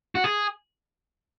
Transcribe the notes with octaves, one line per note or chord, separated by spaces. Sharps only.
F#4
G#4